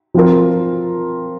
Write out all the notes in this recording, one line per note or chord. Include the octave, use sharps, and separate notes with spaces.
F3 C4 F4 A#4